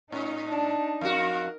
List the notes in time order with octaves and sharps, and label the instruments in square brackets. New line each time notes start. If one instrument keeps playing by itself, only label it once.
[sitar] A2 [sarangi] C#4 [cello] D#4
[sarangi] D4 [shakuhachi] A5
[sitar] F2 F#4 [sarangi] A#4 [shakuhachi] F5